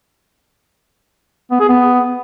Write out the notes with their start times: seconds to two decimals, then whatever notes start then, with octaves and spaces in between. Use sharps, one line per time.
1.51 B3
1.60 G#4
1.69 B3